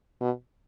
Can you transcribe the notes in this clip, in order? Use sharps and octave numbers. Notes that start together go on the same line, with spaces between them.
B2